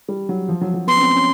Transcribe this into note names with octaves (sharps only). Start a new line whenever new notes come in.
G3
F#3
F3
F#3
F#3
B3 C6
C#4
C4
C#4